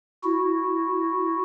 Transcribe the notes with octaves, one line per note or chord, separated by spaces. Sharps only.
E4 F#4